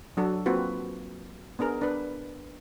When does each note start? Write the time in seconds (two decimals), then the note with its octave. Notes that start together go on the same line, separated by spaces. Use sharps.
0.17 F#3 D4 F#4 A4
0.46 A#3 C4 F4 F#4 B4
1.59 B3 D4 G#4 A#4
1.81 D4 B4